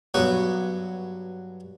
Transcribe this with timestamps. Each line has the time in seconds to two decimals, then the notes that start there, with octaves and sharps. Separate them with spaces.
0.14 G2 F#3 B3 F#4